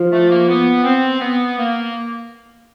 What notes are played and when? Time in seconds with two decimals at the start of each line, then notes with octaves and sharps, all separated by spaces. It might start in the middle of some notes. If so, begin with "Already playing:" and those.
Already playing: F3
0.12 A3
0.30 A#3
0.48 B3
0.84 C4
1.20 B3
1.57 A#3